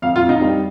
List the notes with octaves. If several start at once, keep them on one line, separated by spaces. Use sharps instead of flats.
F2 F5
F4
F2
D#4
G3